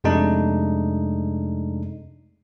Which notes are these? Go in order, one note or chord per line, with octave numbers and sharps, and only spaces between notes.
F2 C3 G#3 A3 D4 D#4